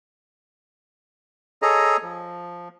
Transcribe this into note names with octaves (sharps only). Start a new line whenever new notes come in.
G#4 A4 C#5 D#5 A#5
F3